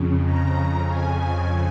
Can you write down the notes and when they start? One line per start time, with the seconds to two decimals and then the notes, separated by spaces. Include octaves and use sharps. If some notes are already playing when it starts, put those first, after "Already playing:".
Already playing: F2 C#3
0.23 A#5
0.87 G#5